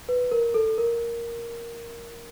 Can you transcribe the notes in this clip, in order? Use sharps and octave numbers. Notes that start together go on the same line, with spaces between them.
B4
A#4
A4
A#4